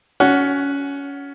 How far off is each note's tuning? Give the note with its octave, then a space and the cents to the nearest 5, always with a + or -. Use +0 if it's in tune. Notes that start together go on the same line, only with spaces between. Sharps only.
C#4 +20 F#4 +0 F#5 +0